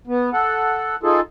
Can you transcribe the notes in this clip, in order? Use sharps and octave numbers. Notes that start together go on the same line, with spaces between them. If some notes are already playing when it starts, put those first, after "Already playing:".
B3
A4 F#5
D#4 F4 G#4 A4